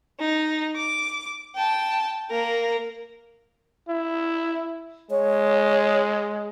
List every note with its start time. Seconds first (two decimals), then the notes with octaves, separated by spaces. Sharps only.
0.20 D#4
0.76 D6
1.55 G5 A5
2.31 A#3 A#4
3.88 E4
5.11 G#3 C#5